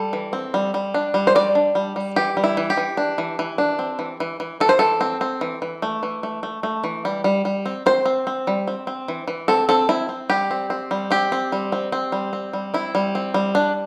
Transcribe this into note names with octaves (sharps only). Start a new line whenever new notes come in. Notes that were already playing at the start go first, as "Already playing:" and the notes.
Already playing: G3 A4
E3
C4
G3
G3
D4
G3
C5
G3 D5
D4
G3
G3
E3 G4
G3
E4
E3
G4
E3
D4
E3
E3
D4
C4
E3
E3
E3
E3 A4
C5
E3 A4
C4
C4
E3
E3
A3
E3
A3
A3
A3
E3
G3
G3
G3
C4
C4 C5
C4
C4
G3
C4
C4
E3
E3
C4 A4
C4 A4
C4 E4
C4
G3 G4
C4
C4
G3
C4 G4
C4
G3
C4
C4
G3
C4
G3
C4 E4
G3
C4
G3
D4